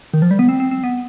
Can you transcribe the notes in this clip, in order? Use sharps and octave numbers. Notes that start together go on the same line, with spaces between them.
D#3
F3
G3
B3
C4
C4
C4
B3